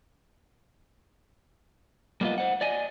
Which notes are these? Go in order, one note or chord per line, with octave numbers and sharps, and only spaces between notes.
G3 A#3 B3 F4 D#5
C5 F#5
D5 D#5 G#5